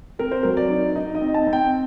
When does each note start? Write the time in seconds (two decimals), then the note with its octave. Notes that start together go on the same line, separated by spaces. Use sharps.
0.19 C4 A#4
0.31 C5
0.43 F#3 A#4
0.57 D5
0.69 D#4
0.95 D#4 D#5
1.15 D#5
1.21 C4
1.34 A5
1.47 C4
1.53 G5